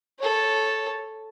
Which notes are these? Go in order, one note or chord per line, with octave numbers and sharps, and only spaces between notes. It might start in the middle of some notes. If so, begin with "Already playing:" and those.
A4 C#5